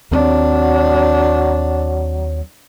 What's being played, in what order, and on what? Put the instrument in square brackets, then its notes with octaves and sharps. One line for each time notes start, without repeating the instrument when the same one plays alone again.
[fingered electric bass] D#2 A3 C4 [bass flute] F#3 [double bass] D4